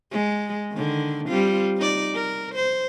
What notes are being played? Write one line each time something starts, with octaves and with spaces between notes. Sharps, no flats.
G#3
D3 D#3
G3 C4 F4
D#4 D5
A#4
C5